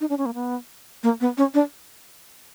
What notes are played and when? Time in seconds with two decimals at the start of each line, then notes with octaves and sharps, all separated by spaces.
0.01 D#4
0.10 D4
0.18 C#4
0.26 A#3
0.34 B3
1.03 A#3
1.21 B3
1.38 C#4
1.54 D4